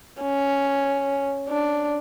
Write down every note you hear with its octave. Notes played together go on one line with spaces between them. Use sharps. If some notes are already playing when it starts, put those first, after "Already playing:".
C#4
D4